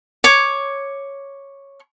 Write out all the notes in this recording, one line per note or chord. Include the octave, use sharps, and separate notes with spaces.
C#5 D6